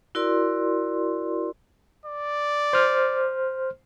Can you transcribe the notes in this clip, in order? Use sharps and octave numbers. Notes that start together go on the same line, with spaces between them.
E4 F#4 A#4 D5 C6
D5
C5 F6